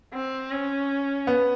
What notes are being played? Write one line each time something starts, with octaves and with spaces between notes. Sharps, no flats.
C4
C#4
B3